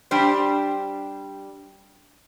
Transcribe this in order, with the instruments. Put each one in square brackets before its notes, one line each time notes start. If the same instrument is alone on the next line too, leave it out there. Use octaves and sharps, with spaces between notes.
[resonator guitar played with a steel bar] G3 D4 G4 C5